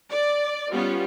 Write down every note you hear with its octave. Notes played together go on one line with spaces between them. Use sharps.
D5
G3 B3 C#4 F4